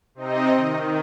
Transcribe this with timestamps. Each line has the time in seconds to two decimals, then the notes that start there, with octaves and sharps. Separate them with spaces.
0.15 C3 C4 D#4 D#5
0.56 D#3